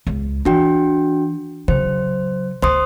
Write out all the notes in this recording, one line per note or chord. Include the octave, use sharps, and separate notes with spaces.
C#2
E3 D4 F#4 G5
C#3 F#3 C5
D2 C5 C6 D#6